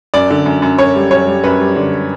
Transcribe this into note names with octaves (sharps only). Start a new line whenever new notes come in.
F#2 D5
D3
F#2
F#2
F#2 C#5
G3
F#2 C#5
G3
F#2 B4
G3
D3